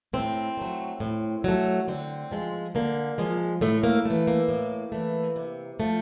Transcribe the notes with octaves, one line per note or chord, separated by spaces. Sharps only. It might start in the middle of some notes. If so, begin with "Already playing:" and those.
A2 C4
F#3 A3
A2
F#3 A3
D3 C4
F3 G#3
D3 A#3
F3 G#3
A2 A3
A#3
E3 A3
A#3
A2
E3 A3
C3
F3 A3